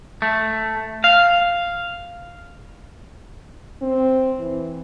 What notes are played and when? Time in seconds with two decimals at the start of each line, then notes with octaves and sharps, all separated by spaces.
0.22 A3
1.04 F5
3.82 C4
4.40 E3